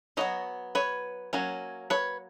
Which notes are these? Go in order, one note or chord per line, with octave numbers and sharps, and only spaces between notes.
F#3 B3 D#4 C#5 D#5
B4 C#5
F#3 A#3 C#4
B4 C#5